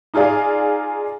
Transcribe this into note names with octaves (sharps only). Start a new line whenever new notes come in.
D#4 F4 G#4 D5 F5